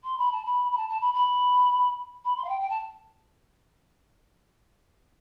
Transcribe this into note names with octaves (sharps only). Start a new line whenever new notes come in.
C6
B5
A5
B5
B5
A5
A5
B5
B5
B5
C6
F5
G5
G5
A5